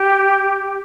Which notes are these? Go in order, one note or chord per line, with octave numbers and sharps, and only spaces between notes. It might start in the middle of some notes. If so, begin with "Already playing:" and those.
Already playing: G4